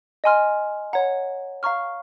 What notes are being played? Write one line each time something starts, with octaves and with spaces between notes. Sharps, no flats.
D#5 G#5 C6 F6
C#5 F#5 A#5
F5 A#5 C#6 F6